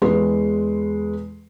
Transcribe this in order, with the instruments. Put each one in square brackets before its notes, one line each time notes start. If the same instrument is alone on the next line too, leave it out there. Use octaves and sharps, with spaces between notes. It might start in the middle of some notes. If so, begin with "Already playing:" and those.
[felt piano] E2 G#3 A4 B4 C6